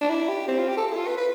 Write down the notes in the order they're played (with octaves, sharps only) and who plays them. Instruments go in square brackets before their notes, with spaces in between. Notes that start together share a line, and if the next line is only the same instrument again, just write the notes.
[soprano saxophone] D4
E4
G4
C4
F4
G4
A4
A4
E4
F4
B4
B4